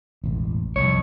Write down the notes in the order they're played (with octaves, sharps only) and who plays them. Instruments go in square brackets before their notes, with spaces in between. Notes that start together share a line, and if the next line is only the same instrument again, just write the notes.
[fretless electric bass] E1 A1
[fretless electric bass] C2 [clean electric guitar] F2 A#2 C#5